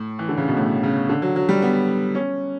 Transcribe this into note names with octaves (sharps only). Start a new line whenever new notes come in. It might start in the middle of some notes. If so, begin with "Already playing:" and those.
Already playing: A2
E3
D3
C#3
B2
A2
C#3
D3
F#3
F#3
G3
B3
C#4